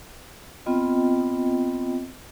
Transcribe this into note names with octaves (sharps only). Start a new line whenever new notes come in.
B3 C4 F4 D#5 G5